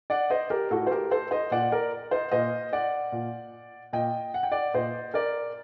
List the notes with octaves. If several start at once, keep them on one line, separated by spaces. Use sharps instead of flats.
D5 F#5
C5 D#5
G4 A#4
A2 F#4 A4
C5
G4 A#4
A4 C5
C5 D#5
A#2 D5 F#5
A#4 D5
C5 D#5
A#2 C5 D#5
D5 F#5
A#2
A#2 D#5 G5
F#5
G5
D5 F#5
A#2 C5 D#5
A#4 D5